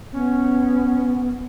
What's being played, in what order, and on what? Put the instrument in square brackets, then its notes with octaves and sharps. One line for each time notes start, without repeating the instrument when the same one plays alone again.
[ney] B3 [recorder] C#4